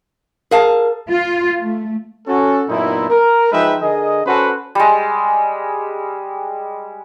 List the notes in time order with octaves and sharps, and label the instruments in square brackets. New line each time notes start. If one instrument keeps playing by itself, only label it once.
[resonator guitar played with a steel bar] G#4 F5 A5 [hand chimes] A#4
[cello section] F4
A3
[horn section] C#4 F#4 A4
F#2 A#2 B3 D#4 E4
A#4
F3 G#3 D#4 B4 E5 G5
D3 G#4 A#4 D#5
C#4 F#4 A4 B4 C5 F#5
[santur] G3 G#3